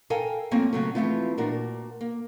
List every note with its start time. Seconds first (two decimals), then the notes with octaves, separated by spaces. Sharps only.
0.10 A4 A#4 F5 G5 G#5
0.51 F3 A3 A#3 C4 C#4
0.73 C#3 F#3 A3
0.95 E3 F3 G#3 A3 C4 F4
1.38 A#2 D4 F#4 A#4
2.01 A#3